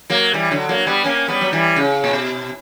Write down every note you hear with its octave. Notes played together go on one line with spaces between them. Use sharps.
F#3 A#3
E3 G3
D3 F#3
F#3 A#3
G3 B3
A#3 C#4
G3 B3
F#3
E3 G3
C#3
A#2
B2